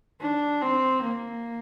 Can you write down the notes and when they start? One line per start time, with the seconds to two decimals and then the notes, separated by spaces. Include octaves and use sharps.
0.21 D4
0.61 C4
1.03 A#3